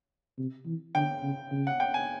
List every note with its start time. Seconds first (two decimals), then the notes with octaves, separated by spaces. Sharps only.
0.38 C3
0.66 E3
0.95 D3 G5
1.23 C#3
1.51 C#3
1.67 F#5
1.80 G5
1.94 G#5